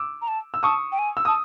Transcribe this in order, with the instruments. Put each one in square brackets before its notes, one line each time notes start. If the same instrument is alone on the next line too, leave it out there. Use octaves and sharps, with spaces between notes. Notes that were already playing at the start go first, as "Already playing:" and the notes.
Already playing: [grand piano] D6 E6
[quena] A#5
A5
[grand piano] E6
[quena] A5 [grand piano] C#6 D#6
[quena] G5
G#5
[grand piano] E6
[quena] A5 [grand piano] D#6